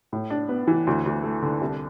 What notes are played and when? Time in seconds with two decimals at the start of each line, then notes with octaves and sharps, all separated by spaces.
0.13 A2
0.30 D4
0.49 B3
0.67 E3
0.87 D2
1.06 D2
1.23 A3
1.43 D3
1.61 C2